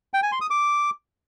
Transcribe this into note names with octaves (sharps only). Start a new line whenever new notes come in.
G5
G#5
C6
D#6
D6